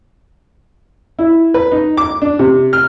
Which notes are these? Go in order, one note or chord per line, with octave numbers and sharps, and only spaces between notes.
E4
B4
D#4
D6
D4
C3
F6